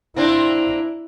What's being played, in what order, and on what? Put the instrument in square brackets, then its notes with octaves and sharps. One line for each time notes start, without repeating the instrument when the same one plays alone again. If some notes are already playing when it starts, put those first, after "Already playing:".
[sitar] A#3 C4 D4 [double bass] E4